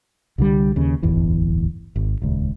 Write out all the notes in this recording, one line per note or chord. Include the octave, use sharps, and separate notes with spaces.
C2 D3 G3
D#2 C#3
D1 G1 E2 E3
G#1
D#1 C#2